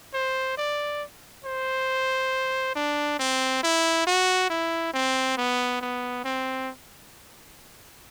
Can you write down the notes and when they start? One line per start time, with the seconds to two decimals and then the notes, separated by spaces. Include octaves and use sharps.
0.14 C5
0.57 D5
1.45 C5
2.75 D4
3.19 C4
3.63 E4
4.07 F#4
4.50 E4
4.94 C4
5.37 B3
5.81 B3
6.24 C4